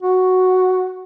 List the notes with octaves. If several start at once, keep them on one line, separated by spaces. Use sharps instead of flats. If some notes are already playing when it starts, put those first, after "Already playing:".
F#4